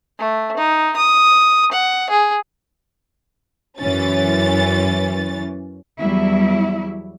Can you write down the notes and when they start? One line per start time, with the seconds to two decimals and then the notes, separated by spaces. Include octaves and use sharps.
0.19 A3
0.57 D#4
0.97 D#6
1.72 F#5
2.10 G#4
3.80 F#2 E3 C#4 A6
5.99 E2 F#3 G3 E4